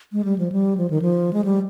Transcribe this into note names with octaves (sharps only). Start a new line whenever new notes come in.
G#3
G3
F3
G3
F3
D#3
F3
G#3
G3